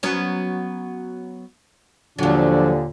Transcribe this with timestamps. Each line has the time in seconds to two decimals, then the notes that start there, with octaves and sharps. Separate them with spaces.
0.03 F#3 B3 C#4
2.19 D#2 A#2 D3 F3 F#3 D4